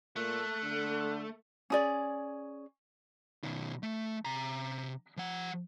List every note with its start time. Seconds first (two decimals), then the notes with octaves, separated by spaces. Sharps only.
0.16 A#2 A3 F#6
0.63 D3
1.70 C#4 G#4 D5
3.43 B2 D#3
3.83 A3
4.25 C3 A#5
5.17 F3 F#5